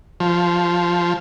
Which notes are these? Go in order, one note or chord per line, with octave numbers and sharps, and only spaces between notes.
F3